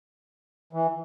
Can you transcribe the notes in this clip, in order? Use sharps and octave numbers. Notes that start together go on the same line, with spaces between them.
E3